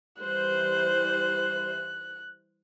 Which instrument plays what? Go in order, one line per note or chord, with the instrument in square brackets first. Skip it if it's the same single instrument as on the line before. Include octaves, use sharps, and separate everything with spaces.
[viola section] E3 G3 C5 [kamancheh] F#6